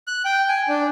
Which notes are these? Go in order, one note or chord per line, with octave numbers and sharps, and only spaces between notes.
F#6
G5
G#5
D4